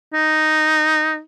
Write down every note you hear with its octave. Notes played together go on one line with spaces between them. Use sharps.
D#4